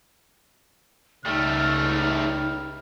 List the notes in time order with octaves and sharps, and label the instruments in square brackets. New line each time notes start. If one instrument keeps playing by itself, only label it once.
[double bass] C#2 [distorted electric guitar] G3 A3 [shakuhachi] D#4 [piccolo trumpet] F6